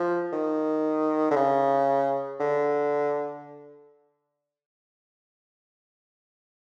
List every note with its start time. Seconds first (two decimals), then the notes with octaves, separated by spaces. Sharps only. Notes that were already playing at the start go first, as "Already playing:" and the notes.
Already playing: F3
0.32 D#3
1.31 D3
1.36 C#3
2.40 D3